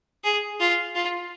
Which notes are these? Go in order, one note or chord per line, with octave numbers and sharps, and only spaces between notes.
G#4
F4
F4